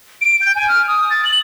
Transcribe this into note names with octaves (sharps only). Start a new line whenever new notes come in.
D7
G6
G#5
F6
D#6
A6
F#7